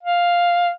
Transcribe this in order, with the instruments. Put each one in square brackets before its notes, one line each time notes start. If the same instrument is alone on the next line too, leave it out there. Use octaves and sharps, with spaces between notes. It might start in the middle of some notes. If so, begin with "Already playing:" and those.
[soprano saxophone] F5